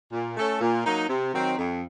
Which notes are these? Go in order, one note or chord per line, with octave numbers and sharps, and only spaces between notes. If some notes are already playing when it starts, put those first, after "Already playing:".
A#2
A3 C#4 A4 C#5
A#2
F#3 A#3 D#4
C3
D#3 F#3 C4 D#4
F2